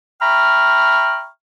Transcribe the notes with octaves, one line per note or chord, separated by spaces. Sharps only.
E5 G5 A#5 B5 C#6 F6